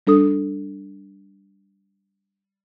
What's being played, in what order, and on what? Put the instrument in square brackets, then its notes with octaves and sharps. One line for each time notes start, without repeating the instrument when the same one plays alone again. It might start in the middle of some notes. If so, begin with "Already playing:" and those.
[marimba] G3 D4 A4 D#6